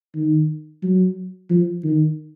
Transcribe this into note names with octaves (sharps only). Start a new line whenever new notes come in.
D#3
F#3
F3
D#3